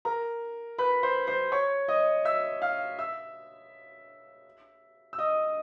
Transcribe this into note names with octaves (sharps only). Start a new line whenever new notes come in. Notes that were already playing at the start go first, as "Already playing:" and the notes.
A#4 A#5
B4 B5
C5 C6
C5 C6
C#5 C#6
D#5 D#6
E5 E6
F5 F6
E5 E6
E6
D#5 D#6